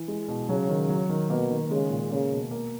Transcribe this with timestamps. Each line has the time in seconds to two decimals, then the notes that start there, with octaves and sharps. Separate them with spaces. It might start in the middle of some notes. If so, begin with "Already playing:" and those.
Already playing: E3
0.08 G#3
0.28 B2
0.49 C#3 F#3
0.69 D#3
0.89 F#3
1.10 D#3
1.30 B2 A#3
1.50 D#3
1.70 C#3 G#3
1.90 A#2
2.10 C#3 A#3
2.32 B2
2.51 A#3